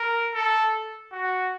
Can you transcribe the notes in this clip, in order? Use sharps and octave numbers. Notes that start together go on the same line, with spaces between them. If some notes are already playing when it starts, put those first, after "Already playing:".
Already playing: A#4
A4
F#4